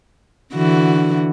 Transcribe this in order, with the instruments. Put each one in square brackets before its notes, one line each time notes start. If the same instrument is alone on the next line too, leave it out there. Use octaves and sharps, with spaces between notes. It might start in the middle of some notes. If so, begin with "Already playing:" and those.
[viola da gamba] D3 E3 F#4